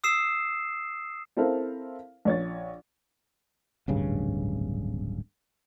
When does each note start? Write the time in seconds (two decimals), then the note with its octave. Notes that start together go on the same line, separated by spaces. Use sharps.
0.04 D#6 E6 C7 E7
1.37 C4 E4 A4 A#4 C5 F5
2.25 A#1 C#5 A6
3.88 D1 G#1 G2 C#3